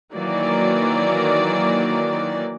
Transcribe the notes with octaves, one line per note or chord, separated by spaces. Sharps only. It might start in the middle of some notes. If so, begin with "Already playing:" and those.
D#3 E3 F#3 A#3 D5